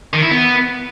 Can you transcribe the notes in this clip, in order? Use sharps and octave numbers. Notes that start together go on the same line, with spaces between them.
D#3
E4
B3